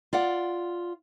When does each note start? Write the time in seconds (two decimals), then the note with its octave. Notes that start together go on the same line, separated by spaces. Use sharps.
0.13 F4 D5 F#5